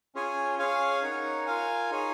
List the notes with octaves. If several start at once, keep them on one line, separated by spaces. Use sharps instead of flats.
C#4 F4 G#4 C#5 G#5
C#4 G#4 C#5 F5 G#5
D#4 A#4 C#5 F#5
F4 A#4 F5 G#5
D#4 G#4 C#5 G#5